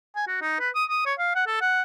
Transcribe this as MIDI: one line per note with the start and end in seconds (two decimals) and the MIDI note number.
0.16 0.27 80
0.28 0.38 66
0.41 0.59 63
0.60 0.70 71
0.75 0.85 87
0.90 1.02 87
1.06 1.14 73
1.19 1.35 77
1.35 1.44 78
1.47 1.59 69
1.61 1.82 78